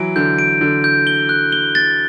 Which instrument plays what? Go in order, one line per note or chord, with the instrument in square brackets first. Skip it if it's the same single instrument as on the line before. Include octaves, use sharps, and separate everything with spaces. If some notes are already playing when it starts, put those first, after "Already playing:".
Already playing: [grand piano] E3 F#3 [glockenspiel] D7
[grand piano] D3 [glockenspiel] G6
[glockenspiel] D7
[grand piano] D3 [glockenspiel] G6
[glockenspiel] G6
G7
F#6
G7
A6